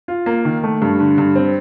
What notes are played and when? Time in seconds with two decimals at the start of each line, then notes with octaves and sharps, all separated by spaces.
0.08 F4
0.26 A#3
0.45 D#3
0.63 A3
0.82 G2
1.00 D3
1.18 G2
1.35 C4